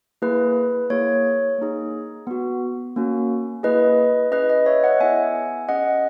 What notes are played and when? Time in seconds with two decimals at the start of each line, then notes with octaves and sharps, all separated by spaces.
0.22 A#3 E4 G#4 B4
0.90 A#3 E4 G#4 C#5
1.58 A#3 D#4 G#4
2.27 B3 F#4
2.96 A#3 C#4 F#4
3.63 A#3 E4 G#4 B4 D#5
4.31 C#4 E4 G#4 B4 D#5
4.49 B4 D#5
4.66 C#5 E5
4.84 D#5 F#5
5.00 B3 E4 G#4 E5 G#5
5.69 C#4 G#4 D#5 F#5